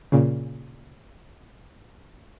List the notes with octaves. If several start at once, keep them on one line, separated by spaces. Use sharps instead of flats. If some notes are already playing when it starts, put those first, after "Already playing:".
A#2 C#3